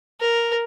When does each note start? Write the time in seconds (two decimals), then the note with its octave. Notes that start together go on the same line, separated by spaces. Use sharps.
0.20 A#4